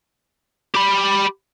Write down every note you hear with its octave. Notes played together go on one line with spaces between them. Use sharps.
G4 B5